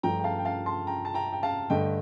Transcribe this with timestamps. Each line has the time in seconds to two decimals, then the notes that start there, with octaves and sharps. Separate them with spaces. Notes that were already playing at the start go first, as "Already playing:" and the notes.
0.03 G2 F3 A3 G5 A#5
0.20 G5
0.24 F5 A5
0.39 G5
0.45 F5 A5
0.66 A5 C6
0.87 G5 A#5
1.05 A5
1.14 G5 A#5
1.33 G5
1.43 F5 A5
1.70 G2 D3 A3 D#5 G5